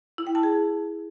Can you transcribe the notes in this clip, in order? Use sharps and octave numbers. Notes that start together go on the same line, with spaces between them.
E4
G5
A5
G#4